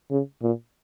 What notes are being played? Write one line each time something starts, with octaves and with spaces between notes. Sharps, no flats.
C#3
A#2